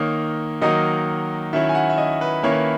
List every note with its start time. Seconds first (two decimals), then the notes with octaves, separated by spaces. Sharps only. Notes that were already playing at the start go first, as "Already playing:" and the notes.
Already playing: D#3 A#3 D#4 C#5
0.61 D#3 F#3 A#3 D#4 D#5
1.53 D#3 F#3 C#4 E4 E5
1.69 G#5
1.75 F#5
1.90 E5
1.98 D#5
2.21 B4
2.43 D#3 A#3 C#4 E4 C#5
2.52 B4